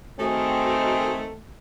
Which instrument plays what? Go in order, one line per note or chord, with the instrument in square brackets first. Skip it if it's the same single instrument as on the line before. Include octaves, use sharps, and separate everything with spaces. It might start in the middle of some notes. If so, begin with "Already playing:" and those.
[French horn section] D#3 C4 [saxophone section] A3 [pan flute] F#4 [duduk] G#4